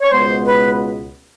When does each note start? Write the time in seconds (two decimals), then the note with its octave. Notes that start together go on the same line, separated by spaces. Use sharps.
0.02 C#5
0.12 C#2 B2 G#3 B3 C5
0.46 B4